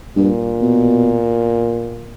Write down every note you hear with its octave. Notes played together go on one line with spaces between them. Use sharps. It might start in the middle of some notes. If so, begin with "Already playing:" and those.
G2 A#2
B2